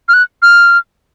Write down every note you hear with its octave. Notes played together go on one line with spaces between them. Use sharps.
F6
F#6
F6